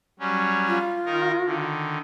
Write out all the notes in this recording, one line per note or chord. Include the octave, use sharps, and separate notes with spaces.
F#3 G3 C#4
F4
D#3 D#4 A#4
D3 D#3